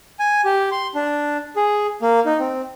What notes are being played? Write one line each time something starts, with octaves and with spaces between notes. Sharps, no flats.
G#5
G4
C6
D4
G#4
A#3
D#4
C4